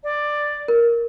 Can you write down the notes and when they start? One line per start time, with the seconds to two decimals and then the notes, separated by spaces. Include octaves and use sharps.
0.04 D5
0.68 A#4